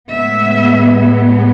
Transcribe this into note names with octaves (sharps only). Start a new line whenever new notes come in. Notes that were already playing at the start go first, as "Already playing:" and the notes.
A2 G#3 B3 E5